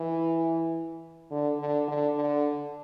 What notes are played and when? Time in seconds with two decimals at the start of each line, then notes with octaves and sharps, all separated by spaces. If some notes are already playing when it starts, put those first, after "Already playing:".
Already playing: E3
1.31 D3
1.59 D3
1.88 D3
2.16 D3